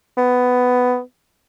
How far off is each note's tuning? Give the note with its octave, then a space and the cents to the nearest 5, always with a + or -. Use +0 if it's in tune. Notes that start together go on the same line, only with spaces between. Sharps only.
B3 +10